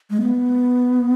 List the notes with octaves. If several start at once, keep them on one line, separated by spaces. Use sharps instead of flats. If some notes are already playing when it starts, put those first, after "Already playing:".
G#3
B3